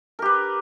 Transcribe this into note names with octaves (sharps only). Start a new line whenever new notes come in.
G4 A#4 B4